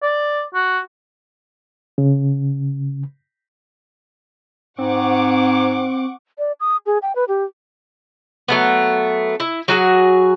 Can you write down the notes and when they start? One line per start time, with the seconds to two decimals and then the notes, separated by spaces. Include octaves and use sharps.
0.03 D5
0.54 F#4
1.98 C#3
4.78 G#2 C4 F#5 C#6 D6
6.38 D5
6.60 D#6
6.86 G#4
7.02 G5
7.15 B4
7.28 G4
8.48 F#3 A3 B3
9.40 E4
9.68 F#3 F#4 G#4